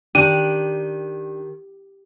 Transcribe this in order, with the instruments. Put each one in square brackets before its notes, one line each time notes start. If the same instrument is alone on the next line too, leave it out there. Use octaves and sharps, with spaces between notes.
[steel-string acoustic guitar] D#3 [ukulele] D4 [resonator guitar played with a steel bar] G4 [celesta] D#7